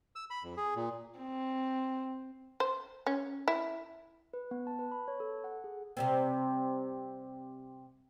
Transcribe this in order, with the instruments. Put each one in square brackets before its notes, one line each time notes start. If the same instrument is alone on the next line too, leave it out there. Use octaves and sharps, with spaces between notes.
[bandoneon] E6
B5
F2
G#4
A#2
[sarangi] C4
[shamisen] C5
C#4
E4
[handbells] B4
B3
A5
B4
B5
C#5
A4
F#5
G#4
[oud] C3 G3 C4